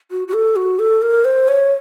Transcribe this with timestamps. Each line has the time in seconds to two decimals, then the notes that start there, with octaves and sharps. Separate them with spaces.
0.11 F#4
0.28 F#4
0.33 A4
0.56 F#4
0.79 A4
1.02 A#4
1.25 C5
1.48 C#5